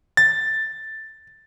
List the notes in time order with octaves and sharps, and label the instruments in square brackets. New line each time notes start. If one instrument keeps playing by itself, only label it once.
[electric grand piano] A6